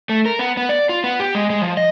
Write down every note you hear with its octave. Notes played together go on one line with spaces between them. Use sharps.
A3
A#4
B3
B3
D5
F4
B3
G4
G#3
G#3
F3
D#5